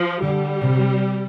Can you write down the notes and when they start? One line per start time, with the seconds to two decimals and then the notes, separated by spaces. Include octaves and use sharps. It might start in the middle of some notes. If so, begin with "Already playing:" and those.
Already playing: F3
0.22 D3 G3
0.62 C3